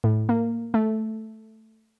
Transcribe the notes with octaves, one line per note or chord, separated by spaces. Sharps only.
A2
A#3
A3